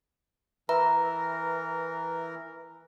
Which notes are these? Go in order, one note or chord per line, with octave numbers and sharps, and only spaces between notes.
E3 A#4 B4 E5 A#5